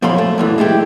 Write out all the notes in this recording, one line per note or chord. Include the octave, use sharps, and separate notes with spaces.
F#2 A#2 F3 C#5 B5 C6
A3
F#2 A#2 E3
G#3 A3 E4 G4